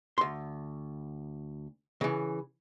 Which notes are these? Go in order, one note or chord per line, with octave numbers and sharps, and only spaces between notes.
D2 C6
C#3 E3